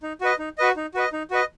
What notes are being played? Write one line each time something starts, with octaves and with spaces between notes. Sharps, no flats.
D#4
F#4 B4 D#5
D#4
F#4 B4 D#5
D#4
F#4 B4 D#5
D#4
F#4 B4 D#5